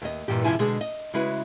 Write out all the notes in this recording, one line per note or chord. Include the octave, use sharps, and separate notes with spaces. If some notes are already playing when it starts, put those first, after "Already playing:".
D#2 D#5
G2 A#2 E3 G4
E2 G#2 C3 F3 E4 G#5
B2 D3 G#3 D4 G#4
D#5
C#3 G#3 E4 F#4 B4